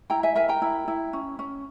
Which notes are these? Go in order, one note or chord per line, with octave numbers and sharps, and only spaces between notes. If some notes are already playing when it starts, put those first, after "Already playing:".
E4 G5 A#5
E5 G#5
A#4 E5 G#5
G5 A#5
E4
E4
C#4
C#4